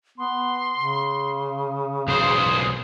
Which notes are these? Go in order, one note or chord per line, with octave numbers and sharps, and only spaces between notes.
B3 C6
C#3
B1 C5 D#6